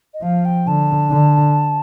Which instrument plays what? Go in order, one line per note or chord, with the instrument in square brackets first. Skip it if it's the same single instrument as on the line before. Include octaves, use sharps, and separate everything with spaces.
[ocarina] D#5
[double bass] F3 [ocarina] F5
[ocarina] G5
[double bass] D3 [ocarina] A5
[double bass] D3